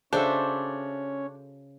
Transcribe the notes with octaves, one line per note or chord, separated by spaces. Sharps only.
C#3 C#4 D4 F#4 A4 C5 C#5 E5